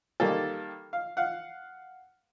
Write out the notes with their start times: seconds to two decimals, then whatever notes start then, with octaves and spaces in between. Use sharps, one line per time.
0.20 D#3 G3 A#3 A4
0.93 F5
1.17 F5 F#5